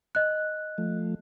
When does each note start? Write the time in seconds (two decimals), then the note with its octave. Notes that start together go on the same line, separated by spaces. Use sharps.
0.15 D#5 F#6
0.78 F3 A3